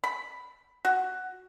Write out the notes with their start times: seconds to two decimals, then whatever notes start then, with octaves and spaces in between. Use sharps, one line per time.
0.04 B5
0.85 F#4